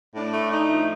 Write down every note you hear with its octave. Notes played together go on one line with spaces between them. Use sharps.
A2 D4
A3
A3 D#4
F3